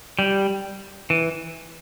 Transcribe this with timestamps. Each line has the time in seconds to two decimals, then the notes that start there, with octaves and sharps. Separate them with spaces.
0.19 G3
1.10 E3